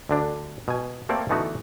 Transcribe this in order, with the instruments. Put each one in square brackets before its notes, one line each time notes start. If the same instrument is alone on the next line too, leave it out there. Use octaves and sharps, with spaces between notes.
[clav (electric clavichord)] D2 D3 D4
B2 G#5
A3 A#3 C4 A4 A#4 D5
D3 E3 A3 B3 D#4 F#4